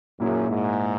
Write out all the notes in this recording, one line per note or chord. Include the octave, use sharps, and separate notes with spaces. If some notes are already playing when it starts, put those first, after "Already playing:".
F#2 A#2 A#3 E4 G#4
G#2